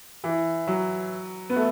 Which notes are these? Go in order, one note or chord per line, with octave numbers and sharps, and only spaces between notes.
E3
F#3
B3
A3